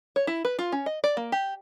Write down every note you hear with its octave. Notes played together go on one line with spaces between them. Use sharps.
C#5
E4
B4
F4
C#4
D#5
D5
A#3
G4